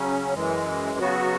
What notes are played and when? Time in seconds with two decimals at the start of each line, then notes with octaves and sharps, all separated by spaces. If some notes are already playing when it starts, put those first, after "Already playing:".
Already playing: C#3 F#3 C#4
0.34 F#2 E3 G#3
0.99 C#3 F#3 B3 F#4